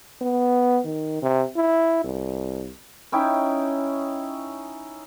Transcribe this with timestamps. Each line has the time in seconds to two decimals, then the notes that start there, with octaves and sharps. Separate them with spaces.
0.21 B3
0.85 D#3
1.22 C3
1.56 E4
2.04 C2
3.12 C#4 D#4 E4 G5